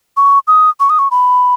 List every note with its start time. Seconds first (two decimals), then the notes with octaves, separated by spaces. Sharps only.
0.17 C#6
0.48 D#6
0.80 C#6
0.90 D#6
0.99 C#6
1.11 B5